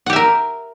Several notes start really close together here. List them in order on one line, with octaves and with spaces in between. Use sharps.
F#5 G4 E5 A#4